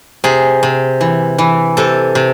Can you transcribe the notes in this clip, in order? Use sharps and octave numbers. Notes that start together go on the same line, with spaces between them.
C3 G#4
C3
E3
E3
C3 A4
C3